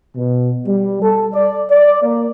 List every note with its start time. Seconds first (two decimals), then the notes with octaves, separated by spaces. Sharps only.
0.16 B2
0.66 G3
1.02 A4
1.34 D5
1.71 D5
2.02 A#3